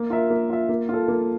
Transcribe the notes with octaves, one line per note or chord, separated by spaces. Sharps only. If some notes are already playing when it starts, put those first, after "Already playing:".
Already playing: A#3
F4 A#4 E5
A#3
F4 A#4 E5
A#3
F4 A4
A#3